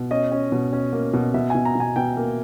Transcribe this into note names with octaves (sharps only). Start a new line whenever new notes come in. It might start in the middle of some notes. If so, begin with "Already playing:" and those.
Already playing: B2
C#4 D#5
C#4
B2
C#4
A#3
B2
B2 E5
B2 G#5
A#5
B2 G#5
B2 G5
A#3